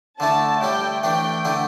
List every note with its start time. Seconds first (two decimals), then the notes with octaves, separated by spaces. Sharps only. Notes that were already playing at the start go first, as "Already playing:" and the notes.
0.20 D3 A3 E4 A5
0.62 A2 G3 E4 G5
1.04 E3 A3 D4 G5
1.45 D3 A3 E4